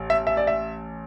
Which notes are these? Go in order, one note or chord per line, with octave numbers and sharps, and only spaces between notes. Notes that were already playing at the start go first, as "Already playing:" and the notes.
Already playing: A1
E5
E5
D5
E5